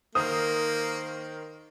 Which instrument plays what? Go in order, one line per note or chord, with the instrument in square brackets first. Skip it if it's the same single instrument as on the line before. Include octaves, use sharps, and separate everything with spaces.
[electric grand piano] D#3 A#4 C5 [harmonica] A#3 [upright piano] D#6